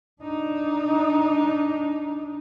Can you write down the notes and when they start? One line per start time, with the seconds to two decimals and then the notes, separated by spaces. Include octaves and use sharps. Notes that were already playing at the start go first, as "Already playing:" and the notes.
0.22 D4 D#4